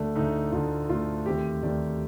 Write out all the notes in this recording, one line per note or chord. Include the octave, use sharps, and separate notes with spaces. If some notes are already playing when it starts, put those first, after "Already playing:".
Already playing: D2 D3 A3 D4
D2 D3 A3 D#4
D2 D3 A3 F4
D2 D3 A3 F4
D#2 D#3 A3 C4 G4
D#2 D#3 A3 C4 D5